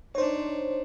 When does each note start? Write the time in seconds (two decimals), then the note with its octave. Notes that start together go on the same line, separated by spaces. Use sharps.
0.15 D4 D#4 C5 C#5